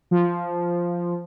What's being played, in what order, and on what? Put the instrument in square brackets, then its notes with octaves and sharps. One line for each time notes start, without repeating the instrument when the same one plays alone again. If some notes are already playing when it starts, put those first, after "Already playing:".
[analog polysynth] F3